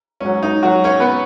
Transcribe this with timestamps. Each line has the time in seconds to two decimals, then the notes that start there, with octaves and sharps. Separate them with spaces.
0.21 G#2 F#3 C#4
0.43 D#4
0.63 F#3 F#4
0.84 C#4 C#5
1.00 B3 B4